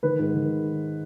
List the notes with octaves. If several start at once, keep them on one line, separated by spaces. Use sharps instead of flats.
D#3 B4
G#2
D#3